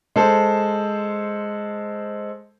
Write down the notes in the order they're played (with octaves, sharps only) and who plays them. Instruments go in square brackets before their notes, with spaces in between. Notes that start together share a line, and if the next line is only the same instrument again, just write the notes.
[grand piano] G#3 A4 C5